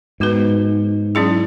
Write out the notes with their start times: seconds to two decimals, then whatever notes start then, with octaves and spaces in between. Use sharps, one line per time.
0.20 G#2 B3 F#4 B4
1.15 F#3 C#4 E4 G#4